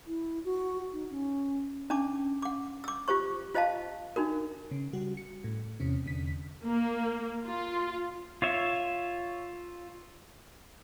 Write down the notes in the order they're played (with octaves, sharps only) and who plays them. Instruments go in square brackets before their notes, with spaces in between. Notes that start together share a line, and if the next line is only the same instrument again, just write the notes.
[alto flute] E4
F#4
D#4
C#4
[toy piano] C#4 D4 A5 D6
F#5 D6
D6 E6
F4 G4 C5 C#6
F4 C5 D#5 F5 A5
D4 D#4 F#4 A#4
[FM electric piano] C#3
C#3 G3 F#4
C#7
A2
E2 C3 C#4
E2 D3 B6
[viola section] A#3
F4
[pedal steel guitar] F4 C#5 E5